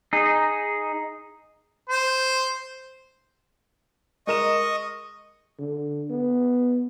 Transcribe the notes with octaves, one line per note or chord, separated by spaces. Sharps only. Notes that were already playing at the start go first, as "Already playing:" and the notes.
D#4 G#4
C5
G#3 A#4 D#5 C#6 D#6 E7
D3
B3